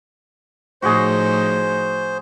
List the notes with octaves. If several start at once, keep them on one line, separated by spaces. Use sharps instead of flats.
A2 F3 D#4 F#4 G#4 C5